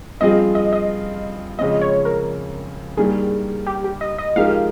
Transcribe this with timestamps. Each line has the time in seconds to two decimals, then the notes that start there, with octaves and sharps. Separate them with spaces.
0.21 G2 F3 C4 F4 G#4 D#5
0.55 D#5
0.73 D#5
1.58 F2 C#3 G#3 C4 D#5
1.82 C#5
2.05 A#4
2.97 G2 D#3 G3 A#3 G#4
3.67 G4
3.84 G4
4.01 D#5
4.18 D#5
4.36 F3 G#3 D#4 G4 A#4 F5